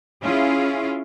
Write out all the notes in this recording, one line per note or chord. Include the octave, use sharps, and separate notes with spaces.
C#4 E4 F4 G#4